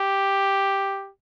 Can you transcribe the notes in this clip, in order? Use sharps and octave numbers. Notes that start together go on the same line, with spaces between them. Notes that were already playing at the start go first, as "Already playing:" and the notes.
Already playing: G4